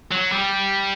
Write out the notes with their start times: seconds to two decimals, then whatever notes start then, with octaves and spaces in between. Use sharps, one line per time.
0.11 F#3
0.32 G3